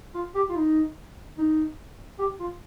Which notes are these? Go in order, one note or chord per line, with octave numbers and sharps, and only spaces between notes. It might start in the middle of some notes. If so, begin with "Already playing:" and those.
F4
G4
F4
D#4
D#4
G4
F4